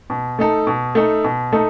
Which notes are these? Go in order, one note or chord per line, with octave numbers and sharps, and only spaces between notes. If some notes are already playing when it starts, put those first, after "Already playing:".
B2
A3 D#4 A4
B2
A3 D#4 A4
B2
A3 D#4 A4